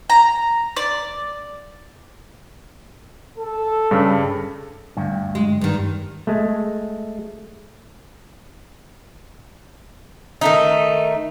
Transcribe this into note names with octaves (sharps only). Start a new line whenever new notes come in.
A#5
D5
A4
G2 C#3 G3
D2 G2
G#3
G2 D#3
G#3 A3
D#3 A3 D#4